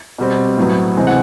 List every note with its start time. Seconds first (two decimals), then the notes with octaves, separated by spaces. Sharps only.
0.18 B2 G3 C4
0.57 A2 F#3 B3
0.97 C3 E3 G#3 C4
1.07 F#5